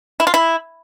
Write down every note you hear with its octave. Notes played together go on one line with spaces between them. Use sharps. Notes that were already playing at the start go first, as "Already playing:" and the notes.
E4
F4
E4